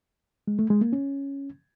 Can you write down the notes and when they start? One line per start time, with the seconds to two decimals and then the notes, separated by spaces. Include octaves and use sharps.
0.47 G#3
0.59 A3
0.70 G#3
0.81 A#3
0.93 C#4